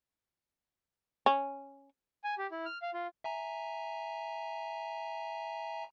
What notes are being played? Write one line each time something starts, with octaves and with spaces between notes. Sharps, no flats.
C#4
G#5
G4
E4
F6
F5
F4
E5 G#5 A#5